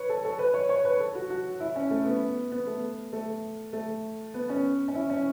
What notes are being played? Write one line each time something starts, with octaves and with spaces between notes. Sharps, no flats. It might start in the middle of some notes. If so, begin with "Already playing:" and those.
Already playing: B4 C#5
A4
A4
B4
C#5
C#5
B4
A4
F#4
F#4
E4
C#4
A3
B3
B3
A3
A3
A3
B3
C#4
C#4
E4
C#4